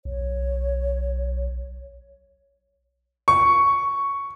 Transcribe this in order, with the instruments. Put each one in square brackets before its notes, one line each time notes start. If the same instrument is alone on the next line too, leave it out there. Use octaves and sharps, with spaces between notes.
[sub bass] B1 [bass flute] C#5
[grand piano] C#6